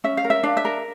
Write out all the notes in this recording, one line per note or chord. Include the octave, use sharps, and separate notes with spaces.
C#4 E5
F5
A#4
E5
D4 F5
E5
A#4